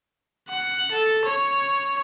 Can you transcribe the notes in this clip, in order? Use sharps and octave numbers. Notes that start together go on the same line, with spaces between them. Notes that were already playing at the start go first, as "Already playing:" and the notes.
F#5
A4
C#5